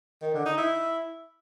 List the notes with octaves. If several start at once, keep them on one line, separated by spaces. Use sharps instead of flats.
D#3
D3
D#4
E4